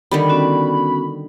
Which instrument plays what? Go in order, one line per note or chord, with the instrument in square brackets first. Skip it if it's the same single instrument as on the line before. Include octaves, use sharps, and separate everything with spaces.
[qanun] D3 D#3 G3 [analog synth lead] B5
[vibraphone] B3 C#4 F#4